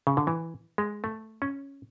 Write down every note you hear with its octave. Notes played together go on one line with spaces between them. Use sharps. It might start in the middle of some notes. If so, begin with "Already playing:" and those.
C#3
D3
E3
G#3
A3
C#4